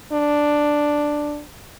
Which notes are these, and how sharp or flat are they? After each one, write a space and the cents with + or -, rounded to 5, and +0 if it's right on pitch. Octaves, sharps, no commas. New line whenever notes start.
D4 +5